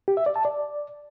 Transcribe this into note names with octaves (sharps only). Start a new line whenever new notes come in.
G4
E5
D5
A5
D5